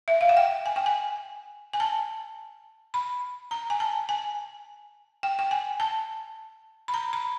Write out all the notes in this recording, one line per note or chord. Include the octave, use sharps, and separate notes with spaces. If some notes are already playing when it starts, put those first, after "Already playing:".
E5
F5
F#5
G5
G#5
G5
G#5
G#5
A5
B5
A#5
G#5
A5
G#5
G5
G5
G#5
A5
B5
A#5
B5